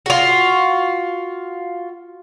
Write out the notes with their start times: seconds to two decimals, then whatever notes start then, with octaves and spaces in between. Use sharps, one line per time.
0.06 F4 F#4